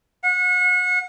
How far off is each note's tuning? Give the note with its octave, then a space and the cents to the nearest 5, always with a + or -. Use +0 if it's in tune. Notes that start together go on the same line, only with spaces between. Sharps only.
F#5 -30